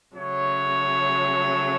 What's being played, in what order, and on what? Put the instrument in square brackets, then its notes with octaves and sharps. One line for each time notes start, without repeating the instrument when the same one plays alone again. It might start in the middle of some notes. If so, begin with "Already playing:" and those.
[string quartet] C#3 F#3 A3 [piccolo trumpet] C#5